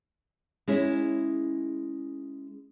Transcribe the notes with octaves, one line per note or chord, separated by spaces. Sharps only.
G#3 C#4 E4